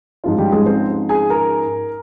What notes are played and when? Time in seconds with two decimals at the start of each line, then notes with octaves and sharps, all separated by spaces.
0.24 G#2 F3 G#3 C#4 F4
0.38 G3 G4
0.52 G#3 G#4
0.66 C4 C5
1.09 G#4 G#5
1.30 A#4 A#5